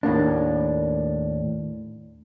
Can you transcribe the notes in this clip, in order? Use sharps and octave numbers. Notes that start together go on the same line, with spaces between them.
D#2 A2 A#3 D4